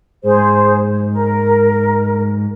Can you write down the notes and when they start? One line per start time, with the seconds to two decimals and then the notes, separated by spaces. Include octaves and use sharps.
0.23 G#2 G#4 C5
1.11 A#4